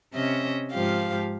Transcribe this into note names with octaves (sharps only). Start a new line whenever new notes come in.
C3 C#4 D#5 E5
G#2 F3 G4 F5